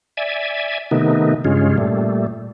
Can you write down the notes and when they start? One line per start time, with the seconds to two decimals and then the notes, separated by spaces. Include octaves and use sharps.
0.17 D5 E5 G#5
0.91 C3 D#3 A3 B3 D#4
1.45 G2 C#3 G#3 C#4 F4
1.78 A#2 G3 A3